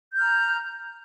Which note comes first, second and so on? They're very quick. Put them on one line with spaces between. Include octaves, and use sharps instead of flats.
G6 F6 A#5